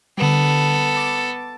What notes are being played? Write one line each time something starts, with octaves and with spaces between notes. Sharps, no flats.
D3 G3 B3 A4
A5 D6 A6